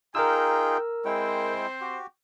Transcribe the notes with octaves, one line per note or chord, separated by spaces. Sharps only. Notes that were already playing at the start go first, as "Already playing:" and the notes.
D#4 F4 G#4 A#4 G5 E6
G#3 C4 E4 C5 G5
F#4 G4